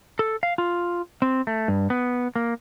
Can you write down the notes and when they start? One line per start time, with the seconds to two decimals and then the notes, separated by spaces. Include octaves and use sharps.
0.19 A4
0.43 F5
0.58 F4
1.22 C4
1.47 A3
1.68 G2
1.90 B3
2.36 A#3